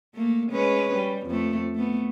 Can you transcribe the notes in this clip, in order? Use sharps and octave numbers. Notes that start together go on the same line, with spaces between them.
A3 A#3
G#3 C#4 B4
G3
F2 A3
A3 B3